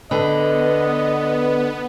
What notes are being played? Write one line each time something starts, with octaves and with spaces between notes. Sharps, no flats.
D3 B3 B4 D#5 A5